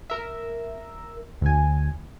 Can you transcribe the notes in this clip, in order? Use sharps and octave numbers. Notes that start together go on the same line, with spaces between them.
A#4 E5
D2 G#5